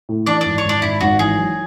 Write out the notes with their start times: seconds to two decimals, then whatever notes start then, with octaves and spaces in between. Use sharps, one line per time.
0.09 A2
0.26 E3 D4 D5
0.41 G#1 D4 D5
0.58 C#5
0.64 G#1
0.69 D4 D5
0.82 G#1 E4
1.01 G#1 F#4
1.19 E3 G#4
1.38 F#3